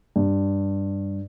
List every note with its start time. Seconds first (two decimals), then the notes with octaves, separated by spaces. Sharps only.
0.16 G2